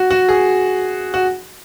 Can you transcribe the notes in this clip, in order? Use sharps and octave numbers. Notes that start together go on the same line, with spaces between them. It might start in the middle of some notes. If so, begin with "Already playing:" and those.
Already playing: F#4
F#4
G#4
F#4